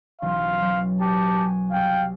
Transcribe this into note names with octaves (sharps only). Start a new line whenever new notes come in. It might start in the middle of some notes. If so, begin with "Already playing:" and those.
B1 E3 C#4 F5 C6
F#3
G4 A5
F#4 G#5
C2 F5 G5